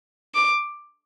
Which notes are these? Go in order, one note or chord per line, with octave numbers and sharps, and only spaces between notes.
D6